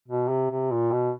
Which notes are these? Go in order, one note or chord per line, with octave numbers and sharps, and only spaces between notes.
B2
C3
C3
A#2
B2